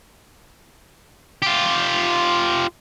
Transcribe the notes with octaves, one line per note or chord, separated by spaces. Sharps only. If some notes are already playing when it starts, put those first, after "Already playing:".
F4 G4